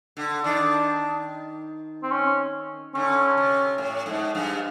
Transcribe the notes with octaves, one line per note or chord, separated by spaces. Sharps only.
D3
D#3 D4
C4
C#4
D3 C#4
C3
A2
G#2
G2